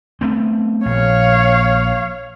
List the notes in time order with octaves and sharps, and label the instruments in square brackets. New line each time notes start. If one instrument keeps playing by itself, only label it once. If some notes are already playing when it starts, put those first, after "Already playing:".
[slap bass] A3 B3 C4
[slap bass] A#1 [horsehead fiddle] C#5 F5